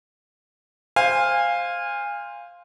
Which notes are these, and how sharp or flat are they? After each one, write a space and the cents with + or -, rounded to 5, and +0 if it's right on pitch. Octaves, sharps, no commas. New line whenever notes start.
C5 +0 F5 +0 G#5 -25